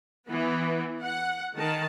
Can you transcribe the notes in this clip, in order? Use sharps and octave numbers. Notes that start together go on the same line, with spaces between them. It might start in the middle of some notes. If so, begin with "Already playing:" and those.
E3 B3
F#5
D#3 A5